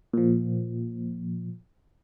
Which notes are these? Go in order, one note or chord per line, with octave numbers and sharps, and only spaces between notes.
A#2 F3